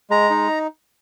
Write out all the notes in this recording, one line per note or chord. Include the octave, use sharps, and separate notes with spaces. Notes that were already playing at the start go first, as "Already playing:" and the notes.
G#3 A#5
D#4